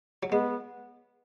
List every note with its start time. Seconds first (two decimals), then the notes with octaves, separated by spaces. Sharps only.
0.23 F#3
0.32 G#3 B3